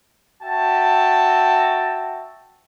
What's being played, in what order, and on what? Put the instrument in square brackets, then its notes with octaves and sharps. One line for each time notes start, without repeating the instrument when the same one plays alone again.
[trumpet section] F#4 E5 G5 A5